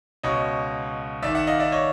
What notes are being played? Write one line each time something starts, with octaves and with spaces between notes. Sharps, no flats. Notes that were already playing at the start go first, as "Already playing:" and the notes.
C#2 B2 C#5 D#5
D#2 D#3 D5 E5
E5 F#5
D#5 F5
D5 E5
C#5 D#5